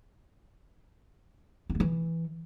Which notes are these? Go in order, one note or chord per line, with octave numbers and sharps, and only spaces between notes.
C4
A3
E3